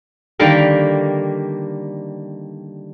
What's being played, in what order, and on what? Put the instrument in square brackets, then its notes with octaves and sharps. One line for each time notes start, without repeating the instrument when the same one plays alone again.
[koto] D3 D#3 G3 A#3 G4 A#4